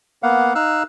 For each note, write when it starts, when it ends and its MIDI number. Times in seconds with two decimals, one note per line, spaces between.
0.23 0.54 58
0.23 0.54 59
0.23 0.54 77
0.23 0.54 78
0.55 0.83 63
0.55 0.83 77
0.55 0.83 88
0.55 0.83 90